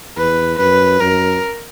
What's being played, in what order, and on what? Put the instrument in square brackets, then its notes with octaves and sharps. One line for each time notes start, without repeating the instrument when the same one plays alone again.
[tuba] E2 [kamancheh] B4
[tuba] F#2 [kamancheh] B4
[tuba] F#2 [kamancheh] A#4